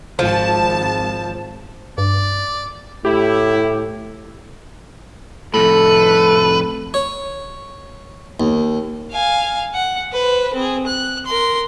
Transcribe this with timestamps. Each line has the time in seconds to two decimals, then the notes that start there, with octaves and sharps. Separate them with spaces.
0.19 G#1 F3 A5
1.98 G2 D5
3.05 A2 E4 G4
5.54 F2 A2 A4 B4
6.94 C#5
8.40 D#2
9.11 F5 G#5
9.74 F#5
10.13 B4 C5
10.54 C4 G#4
10.86 F#6
11.26 A#4 C6